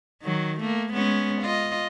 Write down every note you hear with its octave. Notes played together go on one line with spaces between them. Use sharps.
D#3 F#3
A3 A#3
G#3 B3 C#4
F4 D#5